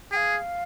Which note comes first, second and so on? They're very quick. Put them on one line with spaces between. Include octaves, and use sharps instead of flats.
G#4 G5 F5